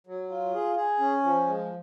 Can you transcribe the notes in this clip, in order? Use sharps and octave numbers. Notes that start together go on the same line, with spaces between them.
F#3
F4
G#4
G#4
C#4
F3
G#3